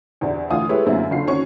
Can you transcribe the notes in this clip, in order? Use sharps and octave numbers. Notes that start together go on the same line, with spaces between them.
E2 C3 D4
D2 E3 F4 G#5 D#6
G#3 E4 G4 A4 B4 C#5
F#2 A2 D3 A#3 C4 E4
F#1 D3 F4 C7
D#3 C4 C#4 F#4 C#6